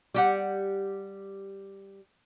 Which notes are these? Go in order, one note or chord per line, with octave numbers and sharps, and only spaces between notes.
G3 G4 F#5